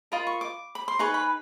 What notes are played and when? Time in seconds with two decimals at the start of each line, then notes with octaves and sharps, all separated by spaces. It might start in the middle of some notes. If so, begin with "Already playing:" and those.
0.12 F4 A#4 D#5 B5
0.27 C#6
0.41 D6
0.75 B5
0.88 C6
0.99 D#4 G#4 B4 C#6
1.14 B5